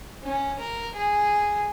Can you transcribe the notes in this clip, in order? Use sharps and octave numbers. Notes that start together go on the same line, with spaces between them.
C#4
A#4
G#4